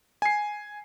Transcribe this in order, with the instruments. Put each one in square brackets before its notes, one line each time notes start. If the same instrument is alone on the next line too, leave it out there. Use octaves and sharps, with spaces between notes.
[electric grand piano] G#5 C7